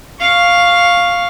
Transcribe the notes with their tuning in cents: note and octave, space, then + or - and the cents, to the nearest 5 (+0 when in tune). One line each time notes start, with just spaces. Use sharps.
F5 +0 C#6 +0